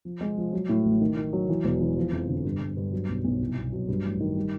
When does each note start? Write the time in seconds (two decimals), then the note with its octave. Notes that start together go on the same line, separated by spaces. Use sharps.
0.05 F3
0.21 G#3
0.38 F3
0.53 F#3
0.69 A2
0.85 A1
1.01 D#3
1.17 D#3
1.33 F#3
1.49 E3
1.64 E1
1.81 E3
1.97 F3
2.13 F2
2.29 D3
2.45 G2
2.60 G2
2.77 G2
2.92 F#3
3.09 B1
3.24 B1
3.41 C2
3.56 B2
3.73 F#3
3.89 G2
4.04 A1
4.20 D#3
4.36 G3